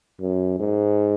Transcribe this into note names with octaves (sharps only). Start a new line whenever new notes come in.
F#2
G#2